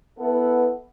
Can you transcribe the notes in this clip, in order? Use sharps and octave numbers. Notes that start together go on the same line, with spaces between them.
B3 E4 A4 B4 F#5